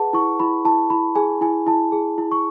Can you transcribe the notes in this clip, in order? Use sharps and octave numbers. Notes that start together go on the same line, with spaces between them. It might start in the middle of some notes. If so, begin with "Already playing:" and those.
Already playing: G#4 B4 F#5 A5
E4 C#6
E4 B5
E4 A5
E4 B5
G#4 G#5
E4 G#5
E4 A5
G#4
E4
C#6